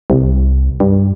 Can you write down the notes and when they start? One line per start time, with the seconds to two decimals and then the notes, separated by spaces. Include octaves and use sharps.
0.10 C2
0.80 G2